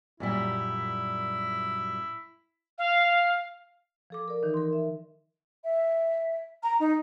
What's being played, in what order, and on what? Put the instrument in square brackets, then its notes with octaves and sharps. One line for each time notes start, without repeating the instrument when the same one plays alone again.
[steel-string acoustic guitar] F#2 A#2 G3 [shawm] E4
[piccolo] F5
[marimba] F3 A4 D6
A#4 D5
D#3 E3 D#4
A#4 C6
E5
[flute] E5
A#5
D#4